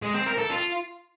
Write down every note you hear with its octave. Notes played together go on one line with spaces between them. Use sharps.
G#3
C4
A#4
A4
F4